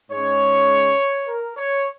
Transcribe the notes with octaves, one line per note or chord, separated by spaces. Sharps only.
G#2 G#3 C#4 C#5
A#4
C#5